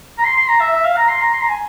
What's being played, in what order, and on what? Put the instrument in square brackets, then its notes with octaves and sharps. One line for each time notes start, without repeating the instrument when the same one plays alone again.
[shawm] A#5
C6
C6
A#5
E5
E5
F5
A#5
C6
A#5
C6
A#5
G#5